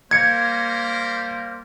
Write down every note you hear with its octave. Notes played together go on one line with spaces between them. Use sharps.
G3 A#3 A#4 C5 G#6 C#7